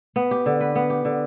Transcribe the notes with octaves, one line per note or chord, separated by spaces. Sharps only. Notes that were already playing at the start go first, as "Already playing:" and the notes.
B3
G4
D3
B4
B3
G4
D3